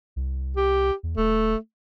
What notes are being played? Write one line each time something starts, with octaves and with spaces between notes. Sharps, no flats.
C2
G4
E2
D#1 A3